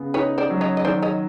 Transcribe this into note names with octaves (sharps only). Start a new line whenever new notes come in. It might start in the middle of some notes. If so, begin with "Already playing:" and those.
Already playing: C#3 B3
D#4 B4 C#5
C5 D5
F#3
C#5 D#5
D#5
D#3 C5 D5
C#5 D#5